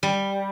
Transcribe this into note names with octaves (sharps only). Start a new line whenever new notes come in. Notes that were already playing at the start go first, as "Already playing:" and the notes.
G3